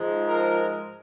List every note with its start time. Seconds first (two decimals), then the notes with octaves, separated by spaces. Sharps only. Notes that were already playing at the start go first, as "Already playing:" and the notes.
Already playing: G#2 F3 G#3
0.27 A#4